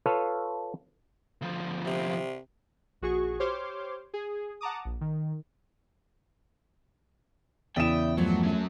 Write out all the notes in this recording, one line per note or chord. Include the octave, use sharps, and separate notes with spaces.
F4 A4 B4 C#5 F5
D2 F3
C3
A#1 F#4 G#4 C#6
G4 C5 C#5 C6 D6 F6
G#4
F#5 A5 A#5 D6 D#6
A#1
D#3
E2 C#3 E4 D5 E5 G5 D#6 E7
G2 F3 F#3 A3
F#3 C#4